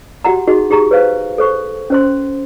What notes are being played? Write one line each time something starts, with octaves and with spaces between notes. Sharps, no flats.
F#4 G4 F#5 A#5
D#4 F#4 G#4 D#5
D#4 G4 G#4 A#5 C#6
B4 C5 F5
A4 C5 C#6
C#4 C5 C6